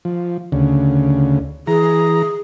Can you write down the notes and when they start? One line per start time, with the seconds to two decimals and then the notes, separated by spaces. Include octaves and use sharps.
0.05 F3
0.52 D2 C#3
1.67 E3 G#4 A#5